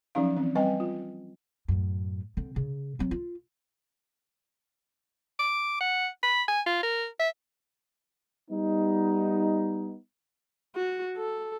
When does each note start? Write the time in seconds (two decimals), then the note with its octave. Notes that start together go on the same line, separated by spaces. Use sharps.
0.15 F3 F#3 C#4 D#4 F5
0.36 E3 C4
0.55 G3 C4 B4 D#5 G5 G#5
0.80 F4
1.68 F#2 A2
2.37 D3 C4
2.56 C#3
2.99 F#3 C4
3.11 F4
5.39 D6
5.81 F#5
6.23 B5
6.48 G#5
6.66 F4
6.83 A#4
7.20 E5
8.50 G3 B3 D#4
10.75 F#4
11.17 A4